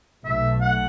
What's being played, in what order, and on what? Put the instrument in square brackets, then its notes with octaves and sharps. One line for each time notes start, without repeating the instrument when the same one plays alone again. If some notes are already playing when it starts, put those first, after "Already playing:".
[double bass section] B1 B2 A3 [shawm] E5
[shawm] F#5